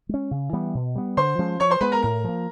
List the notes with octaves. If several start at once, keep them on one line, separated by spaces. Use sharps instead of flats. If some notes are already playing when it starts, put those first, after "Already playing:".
G#3 C#4
C#3
E3 G3 B3
B2
G3 B3
D3 C5 C6
F3 G#3 C#4
F3 C#5 C#6
C5 C6
G#3 B3 B4 B5
A#4 A#5
A2 A#4 A#5
F3 A#3